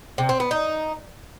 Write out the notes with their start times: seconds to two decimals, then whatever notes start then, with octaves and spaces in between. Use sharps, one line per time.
0.18 C3
0.29 C4
0.40 B3
0.51 D#4